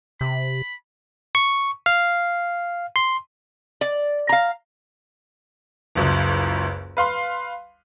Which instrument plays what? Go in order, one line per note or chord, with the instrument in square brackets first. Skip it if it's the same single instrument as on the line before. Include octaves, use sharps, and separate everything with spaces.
[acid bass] C3 [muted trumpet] B5
[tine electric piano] C#6
F5
C6
[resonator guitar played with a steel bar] D5
F5 A#5
[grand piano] F#1 C#2 F#2
B4 F5 C6